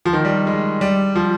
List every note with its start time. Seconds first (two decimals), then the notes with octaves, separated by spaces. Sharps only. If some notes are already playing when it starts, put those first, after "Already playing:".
0.05 F3
0.13 D#3
0.25 G3
0.47 G#3
0.81 G3
1.15 F3